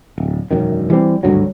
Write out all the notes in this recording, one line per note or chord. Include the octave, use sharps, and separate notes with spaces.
D1
E1 F#2 D#3
E3 G3 C4
G#1 D2 G2 F#3